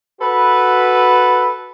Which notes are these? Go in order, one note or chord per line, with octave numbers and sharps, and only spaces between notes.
F#4 A4 B4